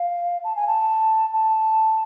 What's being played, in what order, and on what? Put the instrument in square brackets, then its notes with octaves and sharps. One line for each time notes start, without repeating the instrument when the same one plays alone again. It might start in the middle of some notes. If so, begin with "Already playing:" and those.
Already playing: [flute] F5
A5
G#5
A5
A5